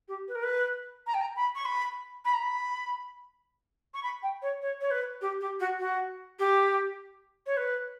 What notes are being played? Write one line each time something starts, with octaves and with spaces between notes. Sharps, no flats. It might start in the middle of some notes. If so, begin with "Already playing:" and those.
G4
B4
A#4
B4
A#5
G5
A#5
B5
C#6
B5
B5
A#5
B5
C#6
B5
G5
C#5
C#5
C#5
B4
G4
G4
F#4
F#4
G4
C#5
B4